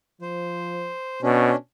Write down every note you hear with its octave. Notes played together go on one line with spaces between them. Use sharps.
F3 C5
B2 C#4 D4